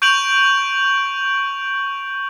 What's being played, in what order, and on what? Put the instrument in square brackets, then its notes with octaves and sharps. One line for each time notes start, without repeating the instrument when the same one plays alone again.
[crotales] C#6 G6 D7 D#7 F7 F#7